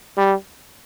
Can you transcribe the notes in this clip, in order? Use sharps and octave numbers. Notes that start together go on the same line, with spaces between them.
G3